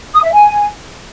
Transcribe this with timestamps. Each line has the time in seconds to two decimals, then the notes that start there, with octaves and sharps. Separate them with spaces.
0.14 D#6
0.23 E5
0.33 G#5